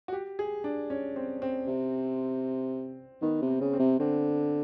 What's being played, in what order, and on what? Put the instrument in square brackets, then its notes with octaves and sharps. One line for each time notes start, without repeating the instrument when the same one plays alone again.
[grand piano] F#4
G4
G#4
D4
C#4
C4
C4
[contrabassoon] C3
[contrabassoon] D#3 [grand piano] B3
[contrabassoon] C3
[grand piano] C4
[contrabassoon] C#3
[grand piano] C4
[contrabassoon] C3
[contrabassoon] D3 [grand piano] C4